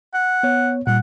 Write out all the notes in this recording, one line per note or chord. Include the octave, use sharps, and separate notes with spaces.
F#5
B3 C#5
A#2 G3 F#5